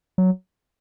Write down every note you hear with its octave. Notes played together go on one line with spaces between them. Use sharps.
F#3